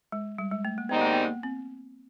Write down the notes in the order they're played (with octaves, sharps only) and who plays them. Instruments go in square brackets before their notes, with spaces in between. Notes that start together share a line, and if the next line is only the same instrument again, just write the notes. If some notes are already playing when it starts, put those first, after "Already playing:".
[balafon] G#3
G3
G#3
A3
A#3
[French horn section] G#2 D#3 G3 C4 D#4 [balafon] B3
[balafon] A#3
B3
A#3
C4